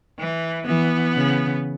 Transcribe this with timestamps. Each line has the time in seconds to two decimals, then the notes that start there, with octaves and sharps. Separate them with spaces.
0.18 E3
0.66 E3 B3
1.15 C#3